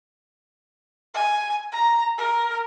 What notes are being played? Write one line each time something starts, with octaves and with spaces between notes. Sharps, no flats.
G#5
A#5
A#4